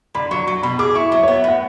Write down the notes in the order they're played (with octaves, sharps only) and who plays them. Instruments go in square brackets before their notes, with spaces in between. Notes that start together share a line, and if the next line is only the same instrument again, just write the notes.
[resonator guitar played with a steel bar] D3 [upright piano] B5
[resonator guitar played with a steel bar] F#3 [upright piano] C#6
[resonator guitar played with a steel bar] F#3 [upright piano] C#6
[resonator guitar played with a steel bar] B2 [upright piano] B5
[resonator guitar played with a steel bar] G#4 [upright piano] D6
[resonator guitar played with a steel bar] E4 [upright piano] C#6
[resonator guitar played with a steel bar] F#3 [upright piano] E5
[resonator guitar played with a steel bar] B3 [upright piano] C#5
[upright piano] E5
[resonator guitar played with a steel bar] A2 [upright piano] F#5